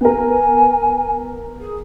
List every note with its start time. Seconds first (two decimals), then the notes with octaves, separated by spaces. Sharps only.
0.01 B3 A#4 G#5
1.60 G#4